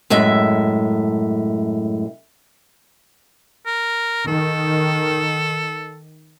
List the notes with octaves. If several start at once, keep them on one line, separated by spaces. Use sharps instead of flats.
F#2 A2 G#3 E5
A#4
D#3 A4